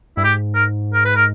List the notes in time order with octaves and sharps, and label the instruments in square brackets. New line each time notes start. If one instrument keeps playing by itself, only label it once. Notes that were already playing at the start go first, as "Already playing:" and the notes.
[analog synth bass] G2 [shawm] E4
[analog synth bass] G#2 [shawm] G4
[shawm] A#4
A#4
B4
A#4